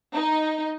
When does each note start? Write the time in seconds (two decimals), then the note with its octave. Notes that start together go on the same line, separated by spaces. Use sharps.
0.14 D#4